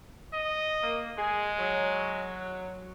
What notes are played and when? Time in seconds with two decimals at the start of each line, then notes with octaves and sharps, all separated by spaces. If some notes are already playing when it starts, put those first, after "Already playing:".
0.33 D#5
0.82 A#3
1.18 G#3 G#4
1.59 F#3